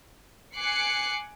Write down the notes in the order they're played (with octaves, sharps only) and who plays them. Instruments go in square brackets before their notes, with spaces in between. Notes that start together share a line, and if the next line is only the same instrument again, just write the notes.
[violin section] G#5 D6 F#6 C7 C#7